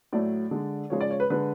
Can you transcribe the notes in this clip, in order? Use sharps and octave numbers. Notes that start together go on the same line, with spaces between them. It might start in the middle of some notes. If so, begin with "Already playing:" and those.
A2 F#3 A3 D5
D3 G#3
C#3 F3 G#3 C#5
D5
C#5
B4
D3 G#3 B4